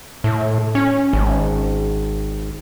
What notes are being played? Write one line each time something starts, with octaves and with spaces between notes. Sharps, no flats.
A2
C#4
G#1